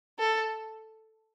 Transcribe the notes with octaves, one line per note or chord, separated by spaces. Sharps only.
A4